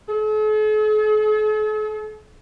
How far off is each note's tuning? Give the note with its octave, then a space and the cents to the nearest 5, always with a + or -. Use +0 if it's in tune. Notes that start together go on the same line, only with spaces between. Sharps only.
A4 -45